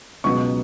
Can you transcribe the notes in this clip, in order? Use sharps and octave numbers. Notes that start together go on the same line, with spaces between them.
C#2 B2 F#3 B3 C#6